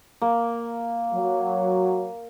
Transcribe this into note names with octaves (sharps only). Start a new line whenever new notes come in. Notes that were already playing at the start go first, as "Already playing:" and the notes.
A#3
F#3